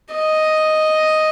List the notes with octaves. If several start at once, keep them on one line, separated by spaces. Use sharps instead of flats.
D#5